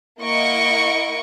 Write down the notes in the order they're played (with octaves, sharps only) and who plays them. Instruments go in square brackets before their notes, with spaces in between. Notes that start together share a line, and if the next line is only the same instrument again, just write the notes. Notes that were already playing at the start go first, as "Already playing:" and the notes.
[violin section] A#3 E4 D#5 F#5 C#6 D7